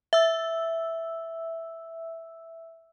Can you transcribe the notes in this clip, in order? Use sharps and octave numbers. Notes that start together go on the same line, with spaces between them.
E5 E6